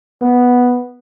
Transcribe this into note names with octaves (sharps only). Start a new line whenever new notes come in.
B3